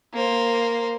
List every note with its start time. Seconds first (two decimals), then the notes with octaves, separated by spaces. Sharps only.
0.13 A#3 C5